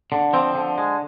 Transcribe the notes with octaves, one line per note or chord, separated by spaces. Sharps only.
D3
F3 C4
D3
G#3